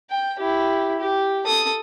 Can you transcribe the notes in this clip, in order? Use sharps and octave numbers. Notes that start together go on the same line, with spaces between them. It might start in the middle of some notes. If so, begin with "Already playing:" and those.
G5
E4 G4
G4
A4 D#6